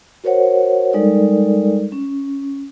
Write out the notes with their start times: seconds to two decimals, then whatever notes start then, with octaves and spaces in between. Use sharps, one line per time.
0.24 F#4 A#4 C5 C#5 F#5
0.93 G3 G#3 D#4 A4 A#4 D5
1.92 C#4